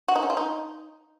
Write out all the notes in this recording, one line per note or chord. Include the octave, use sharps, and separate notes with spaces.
F#4
D#4
C#4
F4
D#4